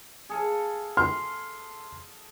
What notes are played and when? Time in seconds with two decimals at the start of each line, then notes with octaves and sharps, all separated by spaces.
0.29 G#4 A4 F5
0.97 C6 F6